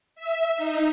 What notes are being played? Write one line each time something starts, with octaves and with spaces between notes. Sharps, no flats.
E5
D#4